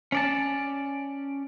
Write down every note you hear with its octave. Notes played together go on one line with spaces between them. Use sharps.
C#4 D5 A5